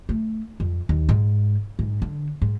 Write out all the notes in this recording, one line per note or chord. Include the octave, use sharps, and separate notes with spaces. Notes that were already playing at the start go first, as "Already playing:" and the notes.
A3
F2
D#2
G#2
G#2
D3
G#2